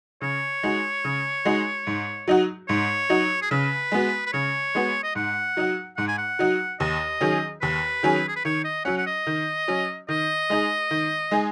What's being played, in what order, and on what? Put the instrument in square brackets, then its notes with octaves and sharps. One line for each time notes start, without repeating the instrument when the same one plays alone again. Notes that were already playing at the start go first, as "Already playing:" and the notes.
[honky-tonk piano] C#3 [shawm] C#5
[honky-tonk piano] G#3 D#4 F#4
C#3
G#3 D#4 F#4
G#2
F#3 D#4 F#4
[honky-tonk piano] G#2 [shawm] C#5
[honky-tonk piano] F#3 D#4 F#4
[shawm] G#4
[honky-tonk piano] C#3 [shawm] B4
[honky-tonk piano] G#3 B3 F#4
[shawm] B4
[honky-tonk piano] C#3 [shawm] C#5
[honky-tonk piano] G#3 B3 F#4
[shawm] D#5
[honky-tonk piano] G#2 [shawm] F#5
[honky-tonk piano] F#3 D#4 F#4
[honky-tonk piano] G#2 [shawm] F#5
[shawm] G#5
F#5
[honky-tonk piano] F#3 D#4 F#4
[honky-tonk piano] D#2 [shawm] D#5
[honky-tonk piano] D#3 F#3 C#4 G#4
[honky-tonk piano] D#2 [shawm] B4
[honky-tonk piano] D#3 F#3 C#4 G#4
[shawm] G#4
B4
[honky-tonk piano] D#3 [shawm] C#5
[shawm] D#5
[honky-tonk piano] F#3 C#4 [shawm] F#5
[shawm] F#5
D#5
[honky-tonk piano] D#3
F#3 C#4
[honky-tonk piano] D#3 [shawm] D#5
[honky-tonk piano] G#3 D#4 G#4
D#3
G#3 D#4 G#4